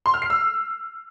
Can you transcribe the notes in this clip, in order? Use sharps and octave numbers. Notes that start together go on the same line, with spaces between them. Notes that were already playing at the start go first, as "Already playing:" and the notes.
C6
F6
C7
E6